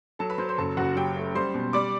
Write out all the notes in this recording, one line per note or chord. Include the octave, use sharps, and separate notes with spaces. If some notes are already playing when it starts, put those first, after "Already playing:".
F#3 A4 A5
B4 B5
F#3 C5 C6
C5 C6
F#1 A4 A5
F#1 F#4 F#5
F#3 G4 G5
A3
G3 C5 C6
B2
G3 D5 D6